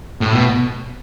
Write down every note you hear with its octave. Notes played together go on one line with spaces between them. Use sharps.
A2
B2